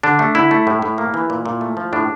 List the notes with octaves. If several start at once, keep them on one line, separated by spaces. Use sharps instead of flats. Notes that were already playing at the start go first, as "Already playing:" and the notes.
D3 D4
A3
D3 E4
A3
A2
A2
A#3
E3
A#2
A#2
A3
F3
A2 D4